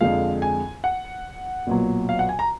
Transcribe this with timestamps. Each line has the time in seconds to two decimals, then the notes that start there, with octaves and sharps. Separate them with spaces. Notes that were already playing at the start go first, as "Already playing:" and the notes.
0.01 F2 D3 G#3 F5
0.42 G#5
0.84 F#5
1.67 B1 A#2 F#3
2.09 F5
2.19 F#5
2.29 G#5
2.39 A#5